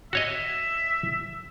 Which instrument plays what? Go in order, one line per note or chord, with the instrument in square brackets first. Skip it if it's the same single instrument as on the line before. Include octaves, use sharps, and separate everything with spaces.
[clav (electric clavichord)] F#4 C#5 D#5 [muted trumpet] E5